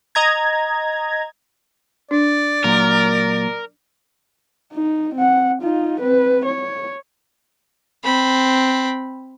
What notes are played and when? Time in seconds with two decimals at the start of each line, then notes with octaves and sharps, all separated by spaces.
0.15 D#5 A#5 G#6
2.11 D4 D5
2.64 A#2 F#3 A#4
4.73 D#4
5.15 C4 F#5
5.62 D#4 F4
6.01 C4 B4
6.46 C#5
8.03 C4 B5